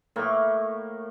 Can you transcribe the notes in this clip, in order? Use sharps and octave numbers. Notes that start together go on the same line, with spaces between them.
A2 A#3 C#6